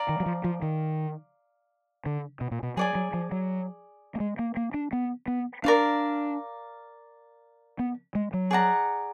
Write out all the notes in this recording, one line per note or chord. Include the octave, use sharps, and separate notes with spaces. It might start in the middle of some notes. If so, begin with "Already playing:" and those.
Already playing: D5 F5 A#5
D#3
F#3
F3
F3
D#3
D3
B2
A#2
B2
F#3 G#4 D5 G#5
F#3
F3
F#3
A#3
G#3
A#3
A#3
D4
B3
B3
D4 A#4 D5 F5
B3
G#3
F#3
G#4 D5 F#5 A#5